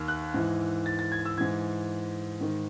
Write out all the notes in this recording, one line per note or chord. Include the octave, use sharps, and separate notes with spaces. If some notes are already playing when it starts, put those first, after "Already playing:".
Already playing: D#2 D#3
F#6
G#2 E3
A6
A6
G#6
E6
G#2 E3 G#6
G#2 D#3